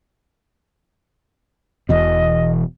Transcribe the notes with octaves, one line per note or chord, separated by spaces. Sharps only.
E1 E2 B2 D#5